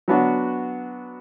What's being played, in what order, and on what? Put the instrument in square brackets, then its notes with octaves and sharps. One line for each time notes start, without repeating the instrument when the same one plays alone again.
[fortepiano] F#3 B3 D4 F#4